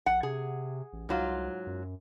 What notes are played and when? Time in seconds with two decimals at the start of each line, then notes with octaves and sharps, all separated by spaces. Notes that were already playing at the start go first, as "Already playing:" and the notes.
0.06 A#1 F#5
0.23 C3 G#4
0.93 A1
1.09 C2 G#2 F#3 F4
1.67 F#2